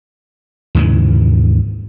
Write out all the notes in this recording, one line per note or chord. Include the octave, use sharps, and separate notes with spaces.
D#2 G#2 C#3 E3